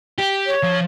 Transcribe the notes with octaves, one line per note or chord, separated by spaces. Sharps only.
G4
C#5
F3